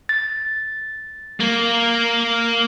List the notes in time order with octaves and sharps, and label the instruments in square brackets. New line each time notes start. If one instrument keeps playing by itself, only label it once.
[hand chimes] A6
[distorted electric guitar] A#3